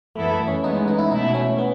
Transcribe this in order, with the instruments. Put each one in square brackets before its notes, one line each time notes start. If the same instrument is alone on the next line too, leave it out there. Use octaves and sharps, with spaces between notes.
[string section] F#2 E3 B3 E4 A4 [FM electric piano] A3
[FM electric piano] A3
C#4
[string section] E3 G#3 B3 [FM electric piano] D#4
[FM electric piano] C#4
D#4
E4
[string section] B2 A3 E4 [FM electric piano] D#4
[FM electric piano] C#4
B3